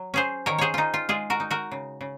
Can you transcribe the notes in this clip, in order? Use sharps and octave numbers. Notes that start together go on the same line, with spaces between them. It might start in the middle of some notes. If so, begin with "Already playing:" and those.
Already playing: F#3
C#4 G#4 C5
D#3 A#4 C#5
G#4 C5 C#5
D#3 D#4 F4
F4
G#3 F4 G#4
F#4 A#4
D#4
F#4 A#4
C#3
C#3